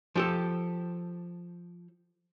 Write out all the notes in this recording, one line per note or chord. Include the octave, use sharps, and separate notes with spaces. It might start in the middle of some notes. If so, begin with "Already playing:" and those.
F3 G4 A4